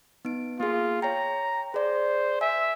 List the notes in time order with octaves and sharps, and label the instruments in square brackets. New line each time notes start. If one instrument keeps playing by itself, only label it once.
[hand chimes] B3 D#4 D7
[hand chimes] A#3 G#4 [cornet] F4
[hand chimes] C#5 G5 [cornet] A#5
[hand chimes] G#4 D5 [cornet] C5
[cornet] E5 [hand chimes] G#5